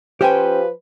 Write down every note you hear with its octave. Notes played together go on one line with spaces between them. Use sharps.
F3 C#4 G4 B4 C5 G5 G#5